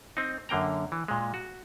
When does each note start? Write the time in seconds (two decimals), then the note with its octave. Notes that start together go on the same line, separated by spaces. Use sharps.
0.17 C4 D#4
0.49 F#2 D3 A#3 G5 A#5
0.92 E3
1.08 A#2 G#3
1.34 F#4